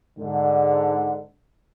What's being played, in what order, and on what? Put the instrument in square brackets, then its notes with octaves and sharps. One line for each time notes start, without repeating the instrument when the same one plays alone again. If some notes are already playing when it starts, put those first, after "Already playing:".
[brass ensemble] G#2 D3